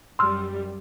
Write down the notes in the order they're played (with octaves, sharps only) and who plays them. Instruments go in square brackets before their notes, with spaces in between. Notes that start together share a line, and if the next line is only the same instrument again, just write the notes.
[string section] F#2 G3 [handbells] C6 E6 F6